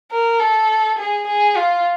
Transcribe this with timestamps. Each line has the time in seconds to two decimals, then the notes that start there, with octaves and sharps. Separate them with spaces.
0.11 A#4
0.40 A4
0.99 G#4
1.27 G#4
1.57 F4